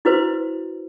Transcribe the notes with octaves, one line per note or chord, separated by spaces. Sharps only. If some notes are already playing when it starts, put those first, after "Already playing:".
E4 F#4 B4 C5